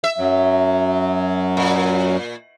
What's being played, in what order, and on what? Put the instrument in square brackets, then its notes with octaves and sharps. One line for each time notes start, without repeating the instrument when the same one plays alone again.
[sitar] E5
[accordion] F#2 F#3
[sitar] A#2